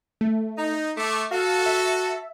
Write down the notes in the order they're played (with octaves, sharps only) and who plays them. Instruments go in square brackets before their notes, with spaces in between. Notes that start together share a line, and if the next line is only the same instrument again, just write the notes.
[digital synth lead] A3
[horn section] D#4
[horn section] A3 [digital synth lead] D6
[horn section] F#4 A4 [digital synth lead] F5
[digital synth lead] E5